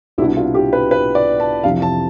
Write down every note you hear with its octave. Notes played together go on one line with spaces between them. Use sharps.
C2 B2 B3 D4 E4
F4
G4
B4
B4
D5
A5
F2 C3 E3 F5
A5